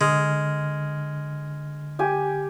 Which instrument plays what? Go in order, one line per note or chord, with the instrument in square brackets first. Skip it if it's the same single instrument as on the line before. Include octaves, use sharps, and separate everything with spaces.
[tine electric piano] D3 F6 [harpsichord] G#3
[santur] G4 G#5